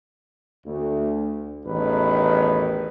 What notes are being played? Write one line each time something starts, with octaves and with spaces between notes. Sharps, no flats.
D2
A1 E2 D#3 B4